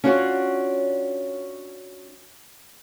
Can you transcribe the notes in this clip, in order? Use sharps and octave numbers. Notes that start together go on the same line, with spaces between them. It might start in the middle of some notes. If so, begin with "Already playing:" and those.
C#4 D4 F4 F#4 C#5 D5